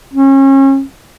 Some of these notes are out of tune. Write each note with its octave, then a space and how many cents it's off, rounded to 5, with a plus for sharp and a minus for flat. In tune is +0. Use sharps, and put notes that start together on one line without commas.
C#4 -35